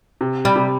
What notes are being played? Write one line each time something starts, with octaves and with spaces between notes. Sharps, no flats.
C3
G3
C3